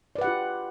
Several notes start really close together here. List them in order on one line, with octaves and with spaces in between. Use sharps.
D5 B4 F#5 G4 F4